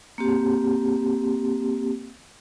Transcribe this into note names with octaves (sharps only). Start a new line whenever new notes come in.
A#3 C4 G4